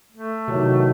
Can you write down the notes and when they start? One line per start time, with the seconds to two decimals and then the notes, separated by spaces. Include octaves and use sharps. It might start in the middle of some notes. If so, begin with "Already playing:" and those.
0.12 A3
0.48 E2 C3 D#3 F#3